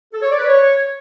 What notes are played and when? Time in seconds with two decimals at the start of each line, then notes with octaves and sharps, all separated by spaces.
0.13 A4
0.21 C#5
0.30 D5
0.38 B4
0.46 C#5